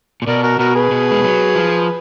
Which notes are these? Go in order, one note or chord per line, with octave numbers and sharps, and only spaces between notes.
A#2
B2 A#4 D5
F#4 A#4
B2 F#4 A#4
G#4 B4
B2
G#3
F#3
F3